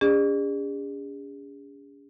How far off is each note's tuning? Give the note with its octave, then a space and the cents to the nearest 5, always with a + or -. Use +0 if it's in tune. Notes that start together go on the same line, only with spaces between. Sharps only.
C#4 +40 G#4 -40 D5 +40